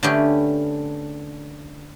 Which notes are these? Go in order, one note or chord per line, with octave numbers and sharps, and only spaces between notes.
D3 A3 B3 C#4 G4